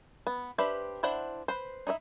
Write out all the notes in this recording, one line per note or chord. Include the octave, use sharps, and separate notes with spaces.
B3
D4 G4 B4 C5 E5
D4 E4 C5 F#5
B4 C5
D#4 E4 D5 E5